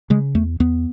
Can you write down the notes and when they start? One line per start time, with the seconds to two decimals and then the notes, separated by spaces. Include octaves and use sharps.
0.10 C#3 G#3
0.35 E2 A3
0.60 E2 B3